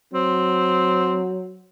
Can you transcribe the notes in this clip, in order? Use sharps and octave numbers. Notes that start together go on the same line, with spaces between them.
F#3 C4